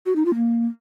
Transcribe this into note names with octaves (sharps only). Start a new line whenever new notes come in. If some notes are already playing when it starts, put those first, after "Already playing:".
F#4
D#4
F4
A#3